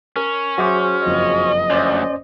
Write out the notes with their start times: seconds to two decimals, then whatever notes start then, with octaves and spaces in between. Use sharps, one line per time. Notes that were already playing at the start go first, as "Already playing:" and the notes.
0.16 C#4 A#4
0.58 F#3 F#4 G#4 C5 E5 D6
1.04 F#1 F2 F4 D#5
1.70 D2 C#4 C5 D5